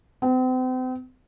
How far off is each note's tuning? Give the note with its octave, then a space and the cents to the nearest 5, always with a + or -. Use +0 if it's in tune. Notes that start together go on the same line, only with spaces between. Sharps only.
C4 -40